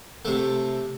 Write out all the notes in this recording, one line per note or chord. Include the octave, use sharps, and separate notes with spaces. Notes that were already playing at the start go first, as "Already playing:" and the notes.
C3 A3